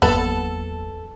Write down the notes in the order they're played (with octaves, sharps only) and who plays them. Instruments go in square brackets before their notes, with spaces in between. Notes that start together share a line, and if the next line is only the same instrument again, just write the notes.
[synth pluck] G1 B4 [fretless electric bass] E2 F#3 A#3 [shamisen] B3 [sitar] A4